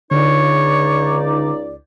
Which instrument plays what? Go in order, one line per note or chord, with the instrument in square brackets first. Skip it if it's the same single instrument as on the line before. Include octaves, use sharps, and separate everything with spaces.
[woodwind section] C#2 D#4 D5 [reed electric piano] D3 [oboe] C#5